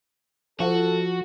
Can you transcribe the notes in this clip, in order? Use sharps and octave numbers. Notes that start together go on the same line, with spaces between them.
F3 F#4 A4